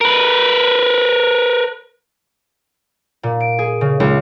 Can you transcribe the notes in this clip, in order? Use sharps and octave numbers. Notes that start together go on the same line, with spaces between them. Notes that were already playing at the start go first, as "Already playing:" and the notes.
A#4 B4
A#2
D7
G#4
C#3
C#2